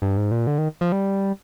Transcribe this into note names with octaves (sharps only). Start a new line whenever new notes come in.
G2
G#2
A#2
D3
D#3
F3
G3